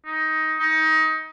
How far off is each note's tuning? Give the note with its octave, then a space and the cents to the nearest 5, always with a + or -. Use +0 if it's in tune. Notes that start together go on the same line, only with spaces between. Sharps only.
D#4 +15
D#4 +25